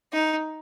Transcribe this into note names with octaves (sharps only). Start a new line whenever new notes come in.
D#4